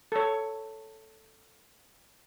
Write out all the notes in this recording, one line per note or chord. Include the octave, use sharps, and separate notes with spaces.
A4 C#5